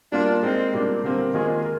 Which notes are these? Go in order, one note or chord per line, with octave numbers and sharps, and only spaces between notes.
G3 A#3 D4 F4
G#3 C4 D#4 A#4
A#2 G3 A#3 D4
D3 G3 A#3 C4 G4 A#4
D#3 G#3 A#3 F4 G#4
A#4